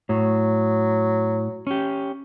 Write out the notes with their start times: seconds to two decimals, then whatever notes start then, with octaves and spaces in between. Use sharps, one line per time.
0.09 A2 F#3
1.67 C#4 G4